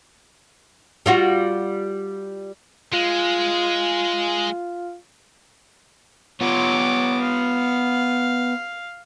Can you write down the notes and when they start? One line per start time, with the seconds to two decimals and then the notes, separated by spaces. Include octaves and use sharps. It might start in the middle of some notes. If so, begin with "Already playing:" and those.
1.06 G3 F4 F#4
2.93 G#3 F4
6.41 B3 F4 C#5 D6
7.22 F5